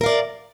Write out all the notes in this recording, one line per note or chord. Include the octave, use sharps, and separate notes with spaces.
A#4 D5 F5